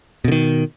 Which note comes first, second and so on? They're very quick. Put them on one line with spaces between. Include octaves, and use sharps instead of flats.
B2 D3 D#3